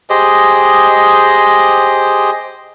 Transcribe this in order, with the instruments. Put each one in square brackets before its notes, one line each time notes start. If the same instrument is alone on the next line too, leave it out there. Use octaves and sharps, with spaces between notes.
[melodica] G4 G#4 C5 D#5